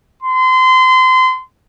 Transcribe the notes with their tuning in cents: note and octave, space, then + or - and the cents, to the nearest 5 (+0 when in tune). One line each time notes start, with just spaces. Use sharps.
C6 -30